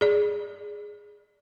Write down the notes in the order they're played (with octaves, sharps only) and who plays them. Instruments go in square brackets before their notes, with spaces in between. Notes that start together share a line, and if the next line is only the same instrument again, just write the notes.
[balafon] G#4 D5